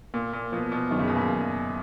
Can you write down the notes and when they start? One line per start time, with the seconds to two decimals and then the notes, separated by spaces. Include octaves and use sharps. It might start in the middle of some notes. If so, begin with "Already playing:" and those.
0.14 A#2 A#3
0.33 A#2
0.52 B2 F3
0.72 B2
0.91 F#2 D#3
0.99 C#3
1.08 B2
1.16 A#2 C#3
1.29 F#2